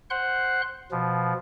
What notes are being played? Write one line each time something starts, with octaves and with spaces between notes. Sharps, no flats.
C5 F#5 C6 F#6
B2 F3